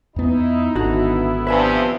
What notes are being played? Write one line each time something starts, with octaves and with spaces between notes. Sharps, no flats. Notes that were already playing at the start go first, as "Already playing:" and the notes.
E2 B3 D#4 E4
G#1 D3 B3 E4 F#4
C3 F3 D4 B4 E5 G#5